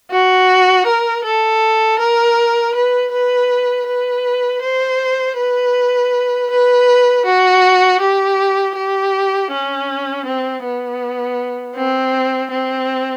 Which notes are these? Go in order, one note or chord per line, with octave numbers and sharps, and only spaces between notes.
F#4
A#4
A4
A#4
B4
B4
B4
C5
B4
B4
F#4
G4
G4
C#4
C4
B3
C4
C4